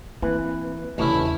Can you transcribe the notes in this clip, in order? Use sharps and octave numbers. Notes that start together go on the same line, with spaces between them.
E3 A#3 C4 B4 F#6
E2 G2 C#3 A3 C#4 E4